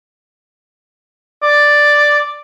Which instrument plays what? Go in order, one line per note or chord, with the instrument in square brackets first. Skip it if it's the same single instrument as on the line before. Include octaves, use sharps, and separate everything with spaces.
[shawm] D5